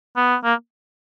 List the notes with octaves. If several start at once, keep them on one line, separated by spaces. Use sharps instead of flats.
B3
A#3